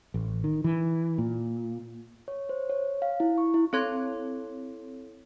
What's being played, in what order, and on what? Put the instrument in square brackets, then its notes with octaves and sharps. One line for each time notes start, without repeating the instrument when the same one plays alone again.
[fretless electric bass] A1
D#3
E3
A#2
[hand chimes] C#5
C5
C#5
F5
E4
C#6
E4
[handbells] C4 E4 A4 C#5 C6 G#6